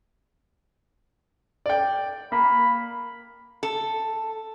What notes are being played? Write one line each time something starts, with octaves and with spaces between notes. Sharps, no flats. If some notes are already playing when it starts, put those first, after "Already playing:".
D5 G5
A#3 B5
A4